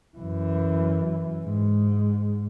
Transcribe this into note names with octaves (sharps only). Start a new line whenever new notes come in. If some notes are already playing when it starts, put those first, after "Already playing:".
F#2 E3
G#2